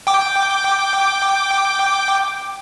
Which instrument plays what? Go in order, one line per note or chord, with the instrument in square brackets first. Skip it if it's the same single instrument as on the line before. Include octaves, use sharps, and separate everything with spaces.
[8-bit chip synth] G5 D6